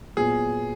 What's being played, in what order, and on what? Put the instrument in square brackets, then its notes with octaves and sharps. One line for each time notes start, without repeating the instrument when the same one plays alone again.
[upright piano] A#2 F#3 B3 [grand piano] G#4